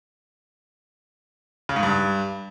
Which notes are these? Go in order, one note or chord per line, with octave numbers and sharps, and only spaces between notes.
C#3
G#2
G2